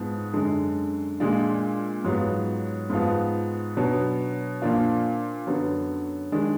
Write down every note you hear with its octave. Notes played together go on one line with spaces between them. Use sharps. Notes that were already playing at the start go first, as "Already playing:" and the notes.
Already playing: G#2 F3 B3
F#2 D3 G#3
A#2 G#3 D4 F4
G#2 F#3 B3 F4
G#2 F3 B3 F4
B2 F#3 B3 D4
A#2 F3 A#3 D4 F4
F#2 D3 F#3 B3
D#3 G#3 D4